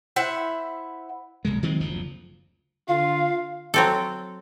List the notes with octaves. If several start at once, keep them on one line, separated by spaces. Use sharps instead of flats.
E4 C5 E5 F#5
D#1 B1 C#3 G#3
D#3 F#3 G#3 C4
F#1 D2 F3
D3 F4 F5
F#3 C4 A4